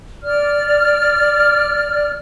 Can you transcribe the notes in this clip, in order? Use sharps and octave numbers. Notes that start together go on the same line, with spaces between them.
D5 F6